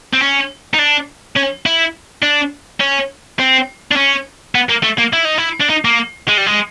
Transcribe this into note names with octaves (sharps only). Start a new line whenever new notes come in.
C4
C#4
D#4
D4
C#4
E4
D4
C#4
C4
D4
C#4
B3
A#3
A3
A#3
E4
D#4
E4
D4
D#4
A#3
G#3
G3
G#3